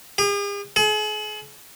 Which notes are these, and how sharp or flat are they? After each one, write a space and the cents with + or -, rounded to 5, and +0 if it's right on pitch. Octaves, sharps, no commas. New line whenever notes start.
G#4 -45
G#4 +40